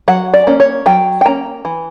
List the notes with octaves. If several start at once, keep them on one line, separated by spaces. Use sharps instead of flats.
F#3 F#5
D5
A#3 C#4
C#5
F#3 G5
G5
A#3 C#4 A#5
E3